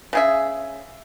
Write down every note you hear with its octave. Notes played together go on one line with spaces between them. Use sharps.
C#3 G#4 E5